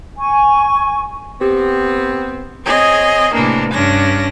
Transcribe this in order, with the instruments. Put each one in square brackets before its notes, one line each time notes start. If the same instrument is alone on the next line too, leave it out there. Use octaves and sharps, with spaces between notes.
[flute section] G#5 C#6
[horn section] B3 C4 [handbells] G4
[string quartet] C4 G#4 C#5 D#5
A2 C3 E3 A#3 D4
G2 C#4 D4 A#6